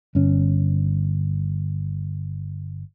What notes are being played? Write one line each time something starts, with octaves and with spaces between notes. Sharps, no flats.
G1 C#4